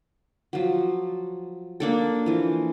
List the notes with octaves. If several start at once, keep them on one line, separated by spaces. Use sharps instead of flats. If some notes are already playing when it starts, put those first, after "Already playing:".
F3 F#3
A#3 D4 A4
E3 F3